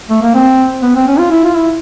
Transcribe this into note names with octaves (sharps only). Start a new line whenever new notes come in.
A3
A#3
C4
B3
C4
C#4
F4
E4
F4
E4